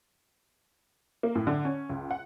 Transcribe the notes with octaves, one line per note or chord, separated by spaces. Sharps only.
A#3
A2
D3
C#4
C#2
F#5